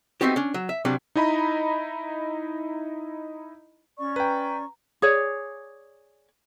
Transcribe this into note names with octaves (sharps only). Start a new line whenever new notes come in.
A3 B3 C4 D#4 F#4 G4
C#4 D4
F#3
E5
C3 F#3 G3 D4
D#4 E4 D#5 A#5 B5
C#4 D5 C#6
B4 G5 A#5
G#4 C#5 D5